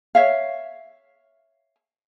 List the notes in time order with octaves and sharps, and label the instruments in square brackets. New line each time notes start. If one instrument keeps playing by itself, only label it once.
[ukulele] C#5 E5 F5